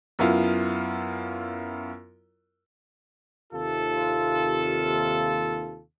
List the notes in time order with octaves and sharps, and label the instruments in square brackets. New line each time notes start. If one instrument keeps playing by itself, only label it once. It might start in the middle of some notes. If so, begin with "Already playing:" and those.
[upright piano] F#2 B3 E4 F4
[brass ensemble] D#2 C3 F4 A4